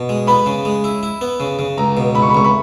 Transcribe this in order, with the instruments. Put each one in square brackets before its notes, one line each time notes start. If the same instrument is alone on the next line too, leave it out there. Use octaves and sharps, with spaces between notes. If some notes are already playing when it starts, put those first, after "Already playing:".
Already playing: [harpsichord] B2
G#3
[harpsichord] B3 [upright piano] B5
[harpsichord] C#3
G#3
E4
E4
B3
C#3
C#3
[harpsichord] C#2 [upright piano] A#5
[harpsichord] B2
[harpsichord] C#2 [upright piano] B5
[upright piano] C#6
B5
[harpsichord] C#2 [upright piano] C#6
[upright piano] B5